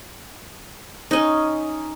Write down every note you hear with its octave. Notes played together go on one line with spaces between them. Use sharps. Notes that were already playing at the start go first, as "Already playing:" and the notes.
C#4 D#4